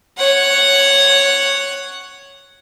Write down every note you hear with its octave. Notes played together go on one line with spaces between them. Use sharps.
C#5 F#5